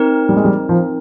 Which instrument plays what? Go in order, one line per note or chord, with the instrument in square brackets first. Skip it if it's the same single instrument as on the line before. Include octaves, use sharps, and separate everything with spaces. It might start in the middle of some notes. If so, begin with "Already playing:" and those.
Already playing: [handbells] C4 D#4 A#4
[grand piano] G3
G#3
G3
F3